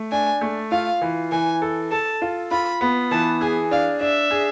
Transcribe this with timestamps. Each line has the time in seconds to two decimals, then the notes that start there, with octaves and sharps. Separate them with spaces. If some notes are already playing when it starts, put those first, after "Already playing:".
Already playing: A3
0.12 D4 G#5
0.41 A3
0.72 F4 F5
1.02 E3
1.32 E3 G#5
1.62 A4
1.92 A4 A5
2.22 F4
2.51 F4 B5
2.81 B3
3.11 E3 A5
3.41 G#4 G#5
3.71 D4 F5
4.01 D4 E5
4.31 G#4